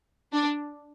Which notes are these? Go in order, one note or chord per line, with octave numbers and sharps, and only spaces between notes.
D4